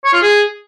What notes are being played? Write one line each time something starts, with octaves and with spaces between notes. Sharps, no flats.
C#5
F4
G#4